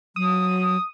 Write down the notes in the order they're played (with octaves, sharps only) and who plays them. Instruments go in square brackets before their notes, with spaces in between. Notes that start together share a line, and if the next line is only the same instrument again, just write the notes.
[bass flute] F#3 [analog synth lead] D#6